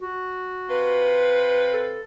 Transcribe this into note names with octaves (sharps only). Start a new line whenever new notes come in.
F#4
C3 F4 B4
A4